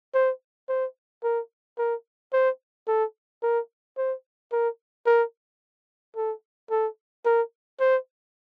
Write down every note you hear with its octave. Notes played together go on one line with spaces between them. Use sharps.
C5
C5
A#4
A#4
C5
A4
A#4
C5
A#4
A#4
A4
A4
A#4
C5